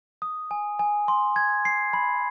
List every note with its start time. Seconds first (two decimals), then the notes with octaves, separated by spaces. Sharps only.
0.22 D#6
0.51 G#5
0.79 G#5
1.08 C6
1.36 G#6
1.65 C7
1.93 B5